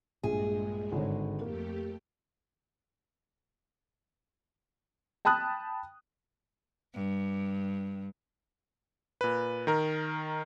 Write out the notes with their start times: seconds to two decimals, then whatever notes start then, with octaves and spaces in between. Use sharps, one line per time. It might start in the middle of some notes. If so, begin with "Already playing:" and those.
0.23 A#1 G2 G#3 G#4
0.92 G#1 D3 C#5
1.41 F2 A3 A#3 G4
5.25 G5 A5 B5 D#6 F#6
6.94 G2
9.21 A#2 B4
9.67 D#3 A#4